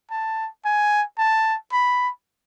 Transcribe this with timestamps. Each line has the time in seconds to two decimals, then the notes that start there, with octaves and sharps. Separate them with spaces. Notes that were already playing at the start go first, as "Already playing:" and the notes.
0.10 A5
0.65 G#5
1.18 A5
1.72 B5